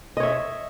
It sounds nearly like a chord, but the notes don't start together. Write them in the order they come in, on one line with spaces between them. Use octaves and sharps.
D#5 C#5 E5